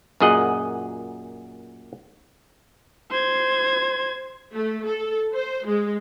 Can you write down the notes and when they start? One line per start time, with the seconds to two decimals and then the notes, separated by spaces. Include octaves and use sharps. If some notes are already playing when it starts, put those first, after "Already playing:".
0.20 F#2 A#2 G#4 D#5 F#5
3.11 C5 G#6
4.55 A3
4.87 A4
5.35 C5
5.66 G#3